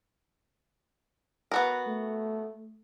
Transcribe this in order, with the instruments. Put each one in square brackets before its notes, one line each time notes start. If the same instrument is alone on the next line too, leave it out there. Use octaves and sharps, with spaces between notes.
[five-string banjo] B3 F#4 A#4
[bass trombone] A3